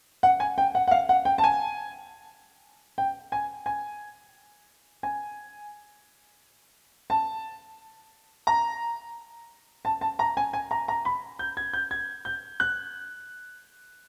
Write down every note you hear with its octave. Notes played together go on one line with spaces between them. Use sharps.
F#5
G#5
G5
F#5
F#5
F5
F#5
G5
A5
G#5
G5
G#5
G#5
G#5
A5
A#5
A5
A5
A#5
G#5
G#5
A#5
A#5
B5
G6
G#6
G6
G#6
G6
F#6